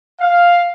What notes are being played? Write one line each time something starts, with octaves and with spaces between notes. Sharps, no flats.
F5